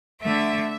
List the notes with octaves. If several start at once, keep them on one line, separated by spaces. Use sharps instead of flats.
D3 A3 E5